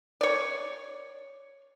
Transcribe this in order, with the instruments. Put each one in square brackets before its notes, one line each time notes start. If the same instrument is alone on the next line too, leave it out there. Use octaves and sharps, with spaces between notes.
[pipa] C#5 D5